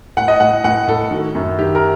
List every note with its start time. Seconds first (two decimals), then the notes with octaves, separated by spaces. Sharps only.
0.17 A2 F#5
0.28 D#5
0.40 A2 F#5
0.64 A2 F#5
0.87 A2 A4
1.11 D#3 F#4
1.35 F#2
1.59 D#3 G4
1.75 A#4